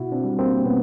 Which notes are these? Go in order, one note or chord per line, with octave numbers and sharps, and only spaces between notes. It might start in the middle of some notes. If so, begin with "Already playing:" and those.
Already playing: B2 E4 F#4
C4 D4
G3
A#3 C4
B2 B3 C#4